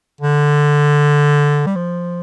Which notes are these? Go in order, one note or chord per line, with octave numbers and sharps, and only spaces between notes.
D3
G3
F3